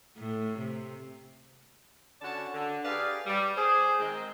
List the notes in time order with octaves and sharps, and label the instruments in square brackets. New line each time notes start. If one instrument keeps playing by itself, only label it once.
[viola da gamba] A2
C3
[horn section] D3 C#4 F#4 D5 A5
D3
G4 G#4 B4 D5 F5
G3
G#4 C5
D#3 G#3 C4